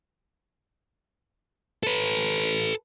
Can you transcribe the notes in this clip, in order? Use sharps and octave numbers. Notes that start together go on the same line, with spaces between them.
A4 B4